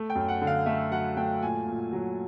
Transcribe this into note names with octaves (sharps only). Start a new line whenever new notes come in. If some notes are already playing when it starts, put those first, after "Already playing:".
Already playing: A3
G5
F#2
F#5
D3
F5
A3 E5
F#3 F#5
A3 G5
A#2 G#5
A#2
F#3